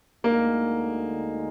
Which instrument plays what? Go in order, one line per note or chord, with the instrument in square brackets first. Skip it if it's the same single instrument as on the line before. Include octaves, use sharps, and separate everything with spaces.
[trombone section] D2 D3 G#3 D#4 [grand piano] A#3